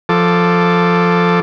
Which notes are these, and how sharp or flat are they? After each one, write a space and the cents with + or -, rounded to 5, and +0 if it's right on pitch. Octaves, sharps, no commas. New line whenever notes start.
F3 +5 A4 +0 D6 +0